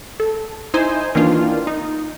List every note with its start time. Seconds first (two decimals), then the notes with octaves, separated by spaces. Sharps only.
0.20 A4
0.74 D#4 E4 C5 G#5
1.15 D#3 E3 A#3 D4 F4
1.67 D#4